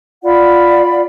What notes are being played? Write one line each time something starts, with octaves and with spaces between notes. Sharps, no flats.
F4 D5 F#5 B5